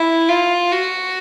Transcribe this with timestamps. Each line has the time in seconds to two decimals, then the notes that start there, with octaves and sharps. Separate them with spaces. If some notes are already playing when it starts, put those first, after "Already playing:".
Already playing: E4
0.29 F4
0.72 F#4